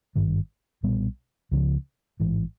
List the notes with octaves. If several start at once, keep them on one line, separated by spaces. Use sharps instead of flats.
G#1 G2 D#3 G3
B1 A#2 G3 B3
C#2 C#3 F3
A1 G#2 E3